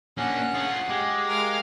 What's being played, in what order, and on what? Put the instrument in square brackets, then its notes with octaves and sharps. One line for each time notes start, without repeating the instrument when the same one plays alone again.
[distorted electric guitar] A#3 D4 [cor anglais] C#4 [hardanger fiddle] F#5
[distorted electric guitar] F4 G#4
[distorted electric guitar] G#3 [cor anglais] G4
[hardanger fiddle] A#4 F5